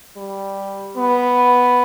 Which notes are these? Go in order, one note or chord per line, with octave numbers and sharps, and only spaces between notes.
G3
B3